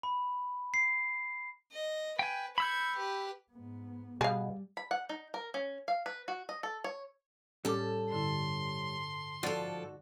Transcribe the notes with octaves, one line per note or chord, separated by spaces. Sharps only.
B5
C7
D#5
B4 G5 G#5
B5 E6 G6 G#6 C#7
G4 B4
G#2 B3
B2 G3 G#4 F5
B5
F#5
D#4
A#4
C#4
F5
B4
F#4
D#5
A4
C#5
A2 G3 C#4 G4 A4 A5 D6
G2 D3 E4 C6
G#2 F3 F#4 A4 D5